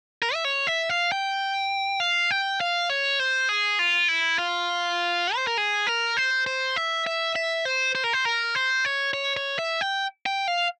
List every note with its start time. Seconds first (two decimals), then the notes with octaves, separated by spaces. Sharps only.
0.22 A#4
0.34 E5
0.45 C#5
0.67 E5
0.89 F5
1.12 G5
2.00 F5
2.31 G5
2.61 F5
2.89 C#5
3.19 C5
3.49 G#4
3.79 F4
4.08 E4
4.38 F4
5.35 C5
5.47 A#4
5.58 G#4
5.87 A#4
6.17 C5
6.47 C5
6.76 E5
7.07 E5
7.36 E5
7.65 C5
7.95 C5
8.04 A#4
8.13 C5
8.25 A#4
8.55 C5
8.85 C#5
9.14 C#5
9.37 C#5
9.59 E5
9.81 G5
10.26 G5
10.48 F5